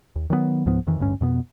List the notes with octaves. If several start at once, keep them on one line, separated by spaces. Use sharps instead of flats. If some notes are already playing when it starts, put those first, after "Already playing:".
D#2
D#3 F#3 G3 B3
C#2 G#2 F3 B3
F2 D#3 E3
A1 D2 G2 C#4
F2 B2 B3